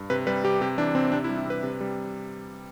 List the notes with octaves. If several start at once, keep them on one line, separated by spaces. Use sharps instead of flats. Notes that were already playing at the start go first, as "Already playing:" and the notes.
Already playing: G2
C3 B4
G3 B4
C3 G4
C3 G4
E3 D4
C3 C4
C3 D4
E4
G3
E4
C3 B4
C3
G3